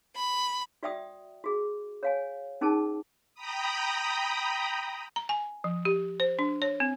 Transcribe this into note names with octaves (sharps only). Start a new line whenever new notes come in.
B5
F#4 D5 E5 G5 D#6
F#4 G#4
C#5 F5 G#5
C#4 D#4 G#4 A#4 A5
G5 A#5 B5 D#6
A#5
G#5
F3
G4
C5
D4
C#5
C4